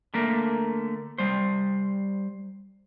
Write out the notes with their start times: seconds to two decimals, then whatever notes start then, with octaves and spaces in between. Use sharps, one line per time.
0.14 D3 A3 A#3 A#4
1.18 G3 C5